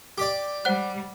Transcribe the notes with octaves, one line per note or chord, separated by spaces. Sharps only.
G4 D5
G3 C5 F#5 F#6